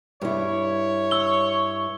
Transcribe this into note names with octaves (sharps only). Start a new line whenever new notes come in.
G2 E4 C#5
C#6 E6 G7